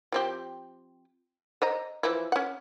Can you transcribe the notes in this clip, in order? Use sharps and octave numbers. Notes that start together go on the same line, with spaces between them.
F3 C4 G4
C5 D#5 A#5
E3 F3 E4
C#4 F#5